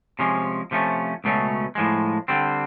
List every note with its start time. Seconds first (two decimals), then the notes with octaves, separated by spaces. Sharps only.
0.19 C3 F3 G#3 C#4
0.71 C3 F3 A3 C#4
1.24 C#2 B2 F#3 A3 C#4
1.75 A2 F3 G#3
2.28 D3 G3 C4